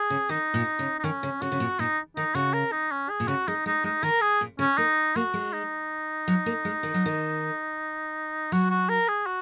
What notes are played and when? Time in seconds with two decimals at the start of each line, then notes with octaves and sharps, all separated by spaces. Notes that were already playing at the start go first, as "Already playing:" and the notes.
Already playing: G#4
0.10 C#3
0.29 D#3 D#4
0.54 A#2
0.79 C#3
0.99 D#4
1.04 D#3 C#4
1.23 C#3
1.42 C#3 F#4
1.52 C#3
1.60 A#2
1.79 A#2 D#4
2.16 D#3 D#4
2.35 C#3 F#4
2.54 A#4
2.72 D#4
2.92 C#4
3.09 G#4
3.20 A#2
3.28 C#3 F#4
3.48 G#3 D#4
3.66 G#3 D#4
3.84 G#3 D#4
4.03 D#3 A#4
4.21 G#4
4.41 A#2
4.59 C#3 C#4
4.77 A#3 D#4
5.16 A#3 F#4
5.34 G#3
5.53 D#4
6.28 F#3
6.46 A#3
6.65 G#3
6.83 D#3
6.94 F#3
7.06 D#3
8.52 F#3 F#4
8.70 F#4
8.89 A#4
9.08 G#4
9.26 F#4